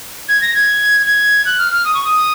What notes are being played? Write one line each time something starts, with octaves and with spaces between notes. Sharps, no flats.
G#6
A#6
G#6
G#6
F#6
F6
F6
D#6
C#6
D#6